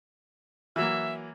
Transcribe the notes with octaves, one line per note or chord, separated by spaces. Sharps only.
E3 F#3 A#3 E5